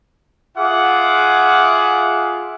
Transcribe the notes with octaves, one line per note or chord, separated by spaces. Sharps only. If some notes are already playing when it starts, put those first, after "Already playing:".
F4 G#4 E5 F#5 D6